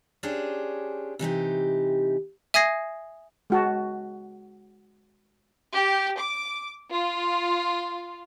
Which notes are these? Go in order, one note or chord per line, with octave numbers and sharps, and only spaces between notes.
C#4 D4 G4 G#4 C5
C3 E3 D#4 G4
E5 G#5 D#6 G#6 A#6 C7
G#3 F#4 A5
G4
D6
F4